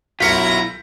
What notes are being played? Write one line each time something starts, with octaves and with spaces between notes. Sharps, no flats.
B1 E4 F4 A#4 C#5 A#5 B6 C#7